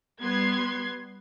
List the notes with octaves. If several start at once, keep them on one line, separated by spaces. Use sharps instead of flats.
G3 B3 C6 G#6